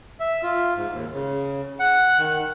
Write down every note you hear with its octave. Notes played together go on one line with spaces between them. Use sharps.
E5
F4
G#2
D#2
C#3
F#5
D#3